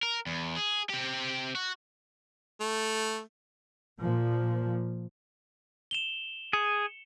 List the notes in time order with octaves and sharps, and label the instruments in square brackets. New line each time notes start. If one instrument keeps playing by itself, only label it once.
[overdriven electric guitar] A#4
E2
G#4
C4 G4
F#4
[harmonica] A3
[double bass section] A#2 F3
[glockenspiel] E7 F7 G7
[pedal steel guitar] G#4 [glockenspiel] C#7